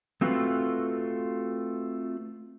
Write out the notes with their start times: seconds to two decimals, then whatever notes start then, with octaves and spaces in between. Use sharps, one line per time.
0.21 A3 C4 F4 F#4 B4